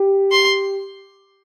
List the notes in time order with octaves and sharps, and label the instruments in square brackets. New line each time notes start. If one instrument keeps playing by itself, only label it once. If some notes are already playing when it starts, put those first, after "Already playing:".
Already playing: [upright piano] G4
[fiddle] C6